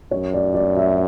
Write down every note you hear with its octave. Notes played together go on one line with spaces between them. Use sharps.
F#2 C#5
D5
D5
E5